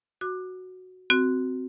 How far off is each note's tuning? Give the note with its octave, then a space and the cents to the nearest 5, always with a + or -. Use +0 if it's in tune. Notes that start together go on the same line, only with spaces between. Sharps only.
F#4 -5 D6 +20
C4 -15 F#4 +0